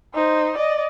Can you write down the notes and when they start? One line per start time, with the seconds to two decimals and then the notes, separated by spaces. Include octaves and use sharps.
0.14 D#4 C5
0.57 D5 D#5